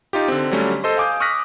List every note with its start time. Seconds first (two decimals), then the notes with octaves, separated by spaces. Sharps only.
0.13 D#4 F4 G4
0.28 D3 C4
0.51 D3 F#3 G3 A3 C#4
0.84 A4 C5 D#5 C6
0.97 F5 G#5 D6 D#6 G6
1.20 C#6 D#6 F6 F#6 A#6 B6